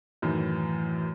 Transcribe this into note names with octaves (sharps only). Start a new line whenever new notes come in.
F#2 A2 D#3 E3